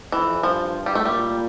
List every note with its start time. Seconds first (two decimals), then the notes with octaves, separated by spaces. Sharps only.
0.12 F2 E3
0.43 G2 F3
0.86 G3
0.95 A3
1.05 A#2 G3